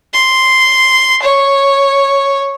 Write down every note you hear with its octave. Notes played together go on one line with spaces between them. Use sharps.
C6
C#5